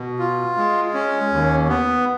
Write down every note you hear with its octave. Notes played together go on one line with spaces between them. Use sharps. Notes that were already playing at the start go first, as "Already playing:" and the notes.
Already playing: B2
F4
G#3
C#4
D#2
B3